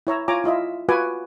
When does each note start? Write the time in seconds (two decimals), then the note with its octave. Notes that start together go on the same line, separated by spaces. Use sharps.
0.07 E4 C#5 A#5 E6
0.28 F4 C#5 G#5 A#5 D6
0.44 E4 F4 D#5 E5
0.89 F4 F#4 B4 F#5 G#5 D6